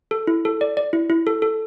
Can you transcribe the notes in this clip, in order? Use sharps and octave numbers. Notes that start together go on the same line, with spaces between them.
A4
E4
A4
D5
D5
E4
E4
A4
A4